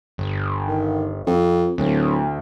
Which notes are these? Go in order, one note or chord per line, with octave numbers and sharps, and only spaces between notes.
G1
D#3
F2
D1 D2